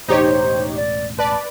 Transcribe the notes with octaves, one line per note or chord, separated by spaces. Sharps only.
E1 A1 D#4 G4 C5 C#5
D5
B4 D5 A5